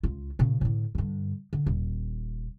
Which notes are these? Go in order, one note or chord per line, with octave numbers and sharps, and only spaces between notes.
C#2 F4
A#2 C#3
A2 D3
G2 D3
D3
D#1